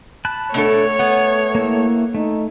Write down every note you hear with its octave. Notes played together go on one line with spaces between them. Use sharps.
A5 B5 F#6
B2 A3 D4 A4 C#5
B3 F#5
A#3 E4
A3 D#4